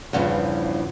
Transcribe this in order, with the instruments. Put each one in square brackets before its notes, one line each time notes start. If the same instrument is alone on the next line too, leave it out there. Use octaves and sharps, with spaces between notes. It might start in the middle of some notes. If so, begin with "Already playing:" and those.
[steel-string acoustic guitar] E2 G2 C#3 F3